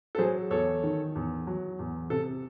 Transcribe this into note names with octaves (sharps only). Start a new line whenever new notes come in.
A4
F#3 G#4 C5
E2 A4 C#5
D#3
E2
F#3
E2
C3 A4